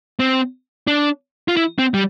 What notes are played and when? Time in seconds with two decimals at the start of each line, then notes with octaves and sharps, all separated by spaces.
0.19 C4
0.87 D4
1.48 F4
1.57 E4
1.79 C4
1.94 G3